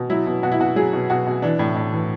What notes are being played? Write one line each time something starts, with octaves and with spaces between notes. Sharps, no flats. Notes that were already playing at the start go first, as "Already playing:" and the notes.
Already playing: B2
F#3 E4
B2
B2 F#4
E4
B2 F#4
F#3 G#4
B2
B2 F#4
B2
E3 D4
A2
A2
E3